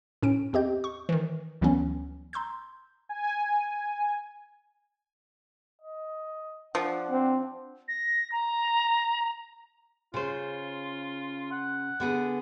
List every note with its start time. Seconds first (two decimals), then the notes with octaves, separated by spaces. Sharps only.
0.22 A2 C#4 D7
0.53 E2 C4 G4 D#5 G6
0.84 C#6
1.09 D#3 E3
1.61 D2 E3 F#3 G3 B3 C#4
2.33 A#5 C6 E6 G6
3.09 G#5
5.82 D#5
6.75 F3 D4 F#5
7.11 C4
7.88 A#6
8.32 A#5
10.14 C#3 F4 C5
11.52 F#5
12.00 D3 B3 G#4